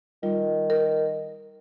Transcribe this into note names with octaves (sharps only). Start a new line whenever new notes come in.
D#3 G3 F4
A#4